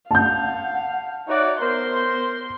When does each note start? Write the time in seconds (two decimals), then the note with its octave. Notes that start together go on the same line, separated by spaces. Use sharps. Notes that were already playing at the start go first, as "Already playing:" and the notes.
0.11 F5 F#5 A5 G6
1.28 D#4 F#4 C#5 D5 E5
1.61 B3 A#4 C5 C6